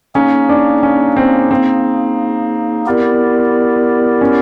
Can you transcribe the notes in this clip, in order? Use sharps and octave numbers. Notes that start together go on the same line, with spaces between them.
A#3 C#4 D#4 G#4
D4
C#4
C4
C4
B3 E4 G4 A#4 D5
C#4